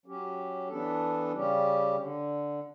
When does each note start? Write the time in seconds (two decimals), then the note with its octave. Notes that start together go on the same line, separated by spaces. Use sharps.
0.06 F#3 C#4 G4
0.68 E3 B3 D4 A4
1.33 C#3 G3 C#4 G4
1.98 D3